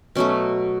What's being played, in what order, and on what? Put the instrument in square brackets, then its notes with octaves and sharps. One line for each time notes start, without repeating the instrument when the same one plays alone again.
[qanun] B2 F#3 A3 C#4